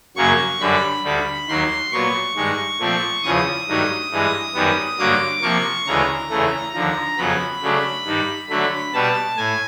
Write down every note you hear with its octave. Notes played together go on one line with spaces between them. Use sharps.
F#2 C#3 F#3 A#3 C#6
F#2 D3 G3 B5
D2 D3 G3
D#2 D#3 F#3 C6
A#2 F#3 B3 C#6
G2 D#3 G#3
A#2 F3 A3 C4
E2 C#3 F3 D#6
G2 D#3 F#3 A3
G2 E3 G#3
F#2 D#3 G3 B3
G2 D3 F#3 A#3 D6
C3 F3 A#3 C#6
D2 C#3 E3 G#3 A#5
E2 C#3 E3 A3
D#2 D3 F3 A#5
F2 C#3 F#3 B3 B5
C#3 F#3 A3 D4
G2 D#3 G3
D3 F#3 A3 B5
B2 G3 B3 A5
A2 G#5